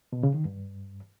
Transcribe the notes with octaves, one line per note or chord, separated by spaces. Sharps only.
B2
C#3
D#3
G2